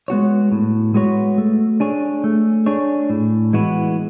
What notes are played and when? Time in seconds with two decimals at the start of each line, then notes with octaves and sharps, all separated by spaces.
0.08 G#3 B3 F#4 C#5
0.52 A2
0.94 G#3 B3 F#4 C#5
1.38 A3
1.80 D4 G#4 C#5
2.24 A3
2.66 D4 G#4 C#5
3.10 A2
3.53 E3 G#3 B3 F#4